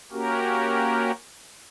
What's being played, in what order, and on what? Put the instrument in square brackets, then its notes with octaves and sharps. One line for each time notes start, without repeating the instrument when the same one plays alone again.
[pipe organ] A#3 C#4 F#4 G4 A#4